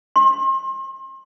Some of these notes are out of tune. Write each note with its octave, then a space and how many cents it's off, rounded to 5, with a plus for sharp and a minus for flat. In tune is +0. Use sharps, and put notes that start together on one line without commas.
C6 +35